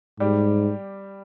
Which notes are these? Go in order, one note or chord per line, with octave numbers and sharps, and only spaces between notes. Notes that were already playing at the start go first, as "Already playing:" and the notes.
G#2 G3 G4